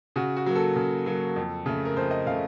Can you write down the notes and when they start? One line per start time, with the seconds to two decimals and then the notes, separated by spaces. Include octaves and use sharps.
0.16 C#3 F#4
0.37 F#4
0.46 F#3 A#3
0.56 A4
0.76 C#3
1.06 F#3 A#3
1.36 F2
1.66 C#3 A3
1.85 A#4
1.96 F2 C5
2.11 D#5
2.26 C#3 A3 F5